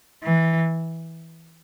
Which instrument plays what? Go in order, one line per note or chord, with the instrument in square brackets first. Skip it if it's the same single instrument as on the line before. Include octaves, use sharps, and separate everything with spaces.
[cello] E3